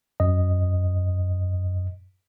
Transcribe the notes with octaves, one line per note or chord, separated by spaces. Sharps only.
F#2 D#5